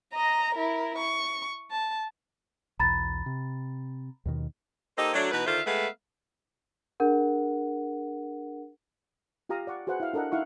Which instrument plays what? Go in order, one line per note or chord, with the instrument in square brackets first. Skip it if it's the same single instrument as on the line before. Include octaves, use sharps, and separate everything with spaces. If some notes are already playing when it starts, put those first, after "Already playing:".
[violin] D#5 A#5
E4 A#4
C#6
A5
[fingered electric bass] B1 E2 [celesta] A#5 B5 A6
[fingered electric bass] C3
D#2 B2 D#3
[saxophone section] A#3 D#4 G4 A4 C5 D#5
F#3 A3 D4
B2 E3 D#4 B4
D3 D#3 F4 C5 E5 F5
G#3 A3 B3 B4 E5 F5
[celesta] D4 G#4 A#4 F#5
[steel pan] F4 G4 F5 A#5 D#6
D5 F#5 C#6
F#4 G#4 B4 C5 F#5
E4 F5
D4 A4 A#4 D#5 F#5
D#4 E4 F5 F#5 C#6